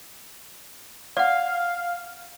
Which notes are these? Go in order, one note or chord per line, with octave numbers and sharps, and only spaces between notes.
D5 F5 F#5